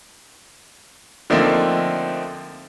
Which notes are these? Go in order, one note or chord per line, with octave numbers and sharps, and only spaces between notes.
D3 F3 A3 A#3 C4 D#4